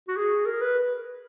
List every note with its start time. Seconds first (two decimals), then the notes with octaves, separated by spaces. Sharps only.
0.08 F#4
0.17 G#4
0.46 A#4
0.62 B4